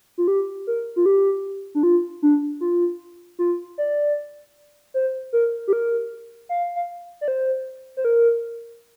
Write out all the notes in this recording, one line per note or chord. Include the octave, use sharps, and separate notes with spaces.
F4
G4
A#4
F4
G4
D4
F4
D4
F4
F4
D5
C5
A#4
G4
A#4
F5
F5
D5
C5
C5
A#4